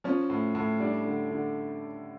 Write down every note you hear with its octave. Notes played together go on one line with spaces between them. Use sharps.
F3 C#4
A2
A2
G3 D4
D3
D3